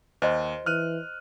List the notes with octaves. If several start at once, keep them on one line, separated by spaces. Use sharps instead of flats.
D#2 C5 D#5 C6
E3 F6 F#6 D#7